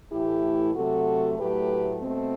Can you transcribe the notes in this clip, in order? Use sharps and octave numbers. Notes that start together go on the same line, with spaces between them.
A2 E3 A3 E4 G4
C3 F#3 A3 F#4 A4
A2 F#3 A3 G4 B4
B2 A3 C4